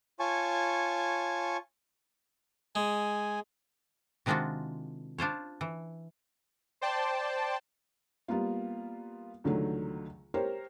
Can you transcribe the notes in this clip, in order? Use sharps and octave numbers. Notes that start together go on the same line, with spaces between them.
F4 C#5 G#5 A5 C#6
G#3 G#5
C3 D#3 G#3 D4 F4 F#4
D4 F4 C5 C#5
E3
C5 D5 G5 A5
G3 A#3 B3 F4
C#2 D3 D#3 F#3 A3
G4 A#4 C5 C#5